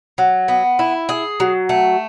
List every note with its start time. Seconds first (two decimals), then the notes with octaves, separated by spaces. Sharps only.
0.18 F#3
0.48 B3
0.79 E4
1.09 G#4
1.40 F#3
1.69 A3